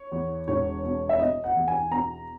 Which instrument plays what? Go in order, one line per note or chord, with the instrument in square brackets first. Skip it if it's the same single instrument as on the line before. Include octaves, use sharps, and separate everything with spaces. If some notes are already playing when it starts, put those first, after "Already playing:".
Already playing: [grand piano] C#5
E2
E1 C#5
B2
E5
B2 D#5
F#5
E2
G#5
B2 A#5